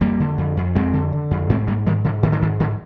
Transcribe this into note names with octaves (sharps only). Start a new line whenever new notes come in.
F2 G3 A#3
D3
F2
F2
F2 G#3 C4
D3
D3
F2
G#2 G#3 C4
G#2 G3 A#3
G#2 D#3 G3
G#2 D3 F3
G#2 D#3
D3
G#2 D#3
G#2 D3 F3